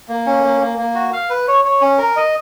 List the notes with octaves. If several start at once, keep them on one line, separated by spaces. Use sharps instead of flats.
A#3
C#4
A#3
A#3
A#3
F#4
F5
B4
C#5
C#5
C#4
A#4
D#5